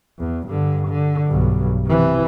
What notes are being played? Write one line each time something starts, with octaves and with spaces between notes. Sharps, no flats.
E2
G2 D3
D3
B1 G2
C3 E3